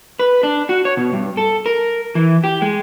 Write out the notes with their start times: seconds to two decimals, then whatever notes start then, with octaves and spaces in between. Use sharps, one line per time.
0.19 B4
0.43 D4
0.69 F#4
0.85 C#5
0.97 B2
1.13 G2
1.37 A4
1.66 A#4
2.15 E3
2.44 G4
2.62 G#3